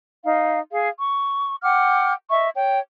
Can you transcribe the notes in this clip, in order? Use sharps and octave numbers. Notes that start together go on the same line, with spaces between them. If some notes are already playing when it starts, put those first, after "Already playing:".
D#4 F5
G#4 F5
C#6
F#5 G5 D6 F6
D#5 E5 C#6
C#5 G5